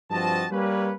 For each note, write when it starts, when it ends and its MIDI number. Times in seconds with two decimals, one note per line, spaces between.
0.11 0.45 43
0.11 0.45 53
0.11 0.45 60
0.11 0.45 66
0.11 0.45 75
0.11 0.45 81
0.51 0.93 55
0.51 0.93 58
0.51 0.93 61
0.51 0.93 71